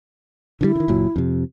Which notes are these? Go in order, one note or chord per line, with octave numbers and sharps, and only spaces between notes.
D3 D#3 G3 E4
D3 D#3
F#1 A#2 F#3
F2 C3